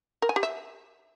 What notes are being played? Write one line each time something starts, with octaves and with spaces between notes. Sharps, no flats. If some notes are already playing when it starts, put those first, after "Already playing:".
A#4
G#5
G4
E5